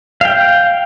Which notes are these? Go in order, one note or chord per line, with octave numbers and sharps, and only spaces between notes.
F5 G5